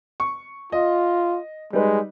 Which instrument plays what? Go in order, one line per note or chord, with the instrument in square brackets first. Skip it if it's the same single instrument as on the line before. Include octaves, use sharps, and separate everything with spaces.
[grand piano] C#6
[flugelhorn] F4 [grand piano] D#5
[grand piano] G3 D#4 B4 [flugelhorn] G#3